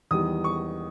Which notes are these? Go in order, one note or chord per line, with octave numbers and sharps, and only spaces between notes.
E2 D#3 G3 D#6
C#6